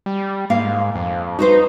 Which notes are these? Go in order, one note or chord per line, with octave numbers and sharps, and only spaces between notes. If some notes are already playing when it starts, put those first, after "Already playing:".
G3
G#2 A#3 F5
F2
D#4 F#4 B4 C5